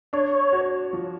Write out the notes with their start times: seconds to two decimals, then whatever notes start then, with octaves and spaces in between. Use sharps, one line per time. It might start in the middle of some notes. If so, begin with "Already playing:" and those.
0.13 D4 C#5
0.53 F#4
0.93 F3